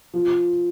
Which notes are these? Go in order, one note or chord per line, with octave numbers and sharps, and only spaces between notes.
F3